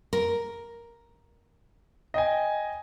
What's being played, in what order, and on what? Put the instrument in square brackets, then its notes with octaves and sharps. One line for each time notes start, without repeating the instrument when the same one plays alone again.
[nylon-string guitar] A#4
[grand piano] D#5 G5 G#5